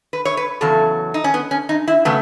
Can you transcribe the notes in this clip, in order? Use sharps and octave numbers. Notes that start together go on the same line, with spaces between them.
B4
C#5
B4
E2 C#3 F#3 A4
D#4
C#4
B3
C#4
D#4
E4
C#3 F#3 A3 B3